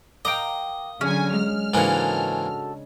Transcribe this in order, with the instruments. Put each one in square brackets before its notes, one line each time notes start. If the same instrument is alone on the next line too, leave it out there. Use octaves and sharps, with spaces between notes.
[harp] A#4 F5 [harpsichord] D#5 [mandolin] G5 A#5 D6
[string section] D3 F#3 G#5 [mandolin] C#4 [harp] G#4
[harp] G#3 [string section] F6
[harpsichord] G#2 E3 A#3 [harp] C#3 D4 D#4 [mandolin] F#4 A4